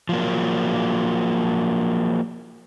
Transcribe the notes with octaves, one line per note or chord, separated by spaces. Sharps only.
F3 F#3 A#3